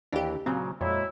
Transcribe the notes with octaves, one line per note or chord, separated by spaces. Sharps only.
D#2 E3 D4 G4 A#4
A#2 C#3 F#3 C4
F2 A#2 F#3 G#3 E4